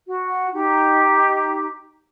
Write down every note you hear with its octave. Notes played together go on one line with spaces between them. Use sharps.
F#4
D#4 G4